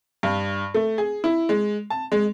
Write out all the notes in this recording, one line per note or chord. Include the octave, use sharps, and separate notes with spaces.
G2
A3
G#4
E4
G#3
A5
G#3